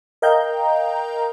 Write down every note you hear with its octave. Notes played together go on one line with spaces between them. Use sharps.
A#4 D#5 F5 G5 A#5 G6